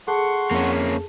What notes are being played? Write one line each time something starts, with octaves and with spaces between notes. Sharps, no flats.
G#4 A4 F#5 A5 C6 C#6
F2 A#3 C#4